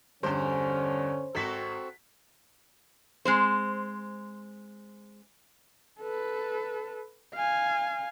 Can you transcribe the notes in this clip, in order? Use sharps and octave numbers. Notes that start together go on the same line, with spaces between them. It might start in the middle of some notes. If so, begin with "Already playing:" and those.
E2 G2 D3 C#4 C5
G#1 C4 F#4 A4 B6
G#3 C4 C5
A4 B4
F5 G#5